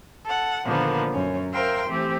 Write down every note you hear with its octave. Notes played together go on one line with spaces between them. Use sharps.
A4 F#5
A#2 D3 D#3 F3 A#3 B3
F#2 C#4
A#4 C5 E5 F5 G5 C6
E3 A3 C4 G4